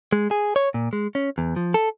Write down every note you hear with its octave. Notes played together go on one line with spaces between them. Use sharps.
G#3
G#4
C#5
A#2
G#3
C#4
E2
F3
A4